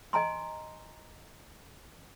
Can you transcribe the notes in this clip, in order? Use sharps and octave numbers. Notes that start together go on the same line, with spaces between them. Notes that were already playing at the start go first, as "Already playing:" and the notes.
D#5 G#5 A#5 C6